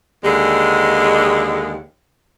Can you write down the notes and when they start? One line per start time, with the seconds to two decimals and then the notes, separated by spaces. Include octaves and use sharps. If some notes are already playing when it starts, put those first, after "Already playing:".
0.24 D#2 D3 G#3